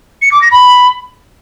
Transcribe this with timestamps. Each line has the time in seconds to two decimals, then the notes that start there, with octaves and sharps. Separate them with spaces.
0.22 C#7
0.32 D6
0.41 A#6
0.51 B5